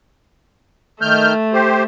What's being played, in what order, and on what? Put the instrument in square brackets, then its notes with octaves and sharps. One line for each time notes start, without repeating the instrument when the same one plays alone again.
[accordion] D#3 F6 G6 [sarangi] A3
[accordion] G4 C5